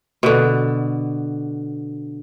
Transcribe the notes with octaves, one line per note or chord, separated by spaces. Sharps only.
B2 D3